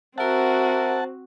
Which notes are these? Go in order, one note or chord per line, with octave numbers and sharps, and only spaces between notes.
C4 F#4 A#4 C5 E5 F#5 A5